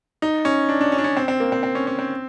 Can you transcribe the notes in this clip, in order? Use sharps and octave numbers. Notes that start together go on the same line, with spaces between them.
D#4
C#4
D4
D4
C#4
D4
C#4
C4
C4
A#3
C4
C4
C#4
C#4
C4